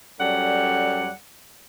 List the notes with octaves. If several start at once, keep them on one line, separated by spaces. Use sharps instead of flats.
F#2 G3 A4 C#5 D5 F#5